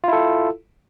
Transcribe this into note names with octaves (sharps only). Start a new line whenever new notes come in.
E4 F4 A4